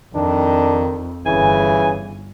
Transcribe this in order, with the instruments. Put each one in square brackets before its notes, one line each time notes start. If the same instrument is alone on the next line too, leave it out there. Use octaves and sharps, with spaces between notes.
[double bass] F2 [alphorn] D#3 [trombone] D4
[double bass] G1 [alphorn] C#3 [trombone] E3 [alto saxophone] G#5